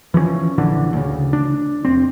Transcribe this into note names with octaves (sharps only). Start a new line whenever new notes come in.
E3 F3 A3 C#4
A#1 D3 E3 D4
D2 C#3
D4
F1 C4